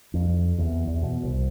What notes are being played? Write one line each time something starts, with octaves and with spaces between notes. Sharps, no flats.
F2
E2
E2
B2
C2